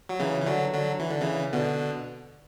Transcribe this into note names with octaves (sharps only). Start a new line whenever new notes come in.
F#3
C#3 E3
E3
D3 F#3
D3 F#3
E3
D3
C#3 E3
B2 D3